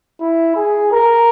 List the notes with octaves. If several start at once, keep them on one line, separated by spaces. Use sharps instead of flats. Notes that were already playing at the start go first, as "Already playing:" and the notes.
E4
G#4
A#4